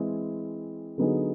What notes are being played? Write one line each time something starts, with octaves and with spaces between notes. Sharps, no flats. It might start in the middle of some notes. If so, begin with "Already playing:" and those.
Already playing: E3 G#3 C4 E4 G#4
D3 F#3 B3 D#4 G#4